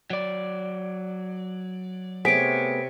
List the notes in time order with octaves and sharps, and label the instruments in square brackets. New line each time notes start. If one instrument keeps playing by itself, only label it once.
[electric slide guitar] F#3 D5
[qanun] C3 C#5 [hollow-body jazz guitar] A3 B3 G#4 [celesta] B6 D7